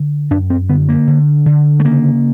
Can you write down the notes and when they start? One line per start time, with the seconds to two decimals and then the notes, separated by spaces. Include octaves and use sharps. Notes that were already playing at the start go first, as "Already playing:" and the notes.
Already playing: D3
0.31 F#2 D4
0.50 C4
0.69 D3 B3
0.89 A#3
1.07 D3
1.46 D3
1.80 A3
1.85 C#3 A#3